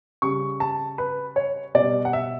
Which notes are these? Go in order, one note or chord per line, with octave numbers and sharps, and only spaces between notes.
C#3 G3 C#6
A5
B4
C#5
B2 G3 D5
F#5
E5